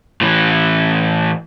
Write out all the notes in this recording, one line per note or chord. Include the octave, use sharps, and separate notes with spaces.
A2 E3